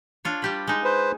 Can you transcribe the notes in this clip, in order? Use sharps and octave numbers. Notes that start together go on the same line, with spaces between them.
D4 F4 C#5
G3 G4 B4
G#3 D#4
B4 C5